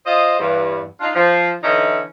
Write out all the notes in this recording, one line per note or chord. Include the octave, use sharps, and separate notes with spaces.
F4 C5 D#5
E2 G2
D4 D#4 F4
F3
D3 E3 C#4 D#4 E4